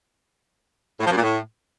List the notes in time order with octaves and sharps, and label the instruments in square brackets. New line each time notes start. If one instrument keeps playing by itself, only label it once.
[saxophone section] A2
F3
F#2
A#2
A2